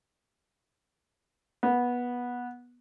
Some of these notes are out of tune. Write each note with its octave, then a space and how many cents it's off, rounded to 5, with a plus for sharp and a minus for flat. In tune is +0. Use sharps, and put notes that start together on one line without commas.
B3 -15